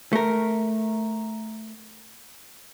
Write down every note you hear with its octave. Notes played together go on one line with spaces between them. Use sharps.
A3 A#4